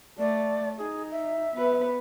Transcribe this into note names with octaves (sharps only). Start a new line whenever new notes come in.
A3 D5
D#4 G#4
E5
B3 B4